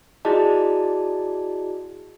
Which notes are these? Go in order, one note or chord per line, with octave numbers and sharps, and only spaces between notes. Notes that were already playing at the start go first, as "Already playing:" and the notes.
E4 F#4 G#4 D5 D#5 A5